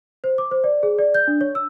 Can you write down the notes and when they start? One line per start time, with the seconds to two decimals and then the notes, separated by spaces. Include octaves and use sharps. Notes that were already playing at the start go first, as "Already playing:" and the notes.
0.24 C5
0.38 D6
0.51 C5
0.64 D5
0.83 G#4
0.98 D5
1.14 G6
1.28 D4
1.41 C#5
1.55 E6